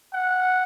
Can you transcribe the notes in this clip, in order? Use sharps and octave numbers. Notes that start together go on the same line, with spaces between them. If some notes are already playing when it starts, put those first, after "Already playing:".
F#5